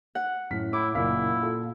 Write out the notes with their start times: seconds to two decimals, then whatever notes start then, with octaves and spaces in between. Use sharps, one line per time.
0.15 F#5
0.51 F#2 A2 F6 B6
0.73 A2 E4 D6
0.95 F#1 A#2 A#3 E4 F5 B6
1.43 F4 A4